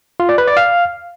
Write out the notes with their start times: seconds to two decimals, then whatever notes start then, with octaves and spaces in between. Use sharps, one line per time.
0.20 F4
0.29 D5
0.38 B4
0.47 D5
0.57 F5